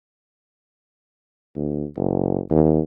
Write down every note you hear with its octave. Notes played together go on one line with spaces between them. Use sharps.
D2
F#1
D#2